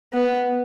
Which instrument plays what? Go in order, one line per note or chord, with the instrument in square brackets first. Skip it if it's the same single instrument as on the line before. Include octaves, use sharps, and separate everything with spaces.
[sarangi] B3